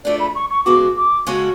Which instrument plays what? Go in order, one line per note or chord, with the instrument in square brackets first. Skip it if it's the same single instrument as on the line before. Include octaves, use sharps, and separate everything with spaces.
[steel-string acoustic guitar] F3 A3 D4 G#4 [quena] D5
[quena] B5
C#6
C#6
[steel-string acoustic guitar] C#3 G#3 B3 F#4 [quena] D6
[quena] D6
[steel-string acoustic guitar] C#3 G#3 C#4 F#4 A4 [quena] C#6